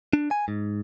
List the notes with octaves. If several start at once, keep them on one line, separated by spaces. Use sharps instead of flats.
D4
G#5
G#2